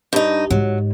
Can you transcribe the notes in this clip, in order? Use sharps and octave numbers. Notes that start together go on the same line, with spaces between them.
G2 D#4
G#2 F#3